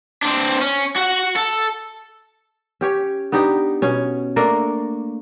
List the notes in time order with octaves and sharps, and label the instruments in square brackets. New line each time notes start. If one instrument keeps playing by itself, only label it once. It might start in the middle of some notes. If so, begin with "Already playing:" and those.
[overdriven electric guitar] C4 D4
C#4
F#4 F#5
A4
[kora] C#4 G4 C#5
B3 D4 D#4 G4
B2 C#4
A3 A#3 D4 A#4